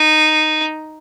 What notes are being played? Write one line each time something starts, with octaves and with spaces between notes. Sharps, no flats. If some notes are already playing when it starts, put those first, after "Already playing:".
Already playing: D#4